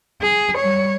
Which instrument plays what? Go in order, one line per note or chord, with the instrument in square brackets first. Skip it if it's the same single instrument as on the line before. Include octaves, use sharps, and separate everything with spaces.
[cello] G#4
G3 C#5